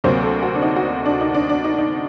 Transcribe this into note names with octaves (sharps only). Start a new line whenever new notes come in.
D2 C3 F#3 A#3 C5
A4
F#4
D4
D#4
F#4
D4
D#4
D4
D4
D#4
D#4